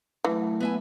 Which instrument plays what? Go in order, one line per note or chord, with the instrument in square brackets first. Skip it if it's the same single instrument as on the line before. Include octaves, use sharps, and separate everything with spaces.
[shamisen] E3 [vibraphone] F#3 A3
[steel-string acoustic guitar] B3 E5 G#5